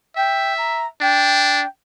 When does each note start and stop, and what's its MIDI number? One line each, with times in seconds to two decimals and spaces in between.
0.16 0.89 76
0.16 0.55 79
0.57 0.86 82
1.01 1.63 62
1.01 1.67 79